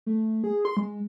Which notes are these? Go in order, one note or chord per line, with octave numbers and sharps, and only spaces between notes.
A3
G#4
C6
G#3